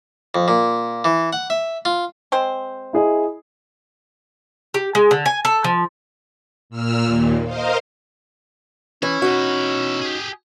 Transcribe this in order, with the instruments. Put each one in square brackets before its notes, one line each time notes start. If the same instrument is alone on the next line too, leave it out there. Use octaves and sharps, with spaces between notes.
[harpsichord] F2
A#2
E3
F#5
E5
F4
[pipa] G#3 C4 C5
[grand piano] E4 G#4 D#5
[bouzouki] G4
G#3
D3
G#5
A4
F3
[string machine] A#2 E6 F6
D#2 A#2
A#4 C5 D#5 F5
[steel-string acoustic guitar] E3 [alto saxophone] C#4 [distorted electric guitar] E4
[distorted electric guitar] B2 E4 [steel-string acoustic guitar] D#4 F#4
[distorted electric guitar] G4 G#4